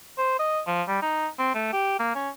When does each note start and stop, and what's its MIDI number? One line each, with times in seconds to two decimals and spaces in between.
0.18 0.35 72
0.39 0.61 75
0.67 0.83 53
0.88 0.99 55
1.02 1.27 63
1.39 1.53 60
1.55 1.68 57
1.73 1.98 67
1.99 2.12 58
2.15 2.29 61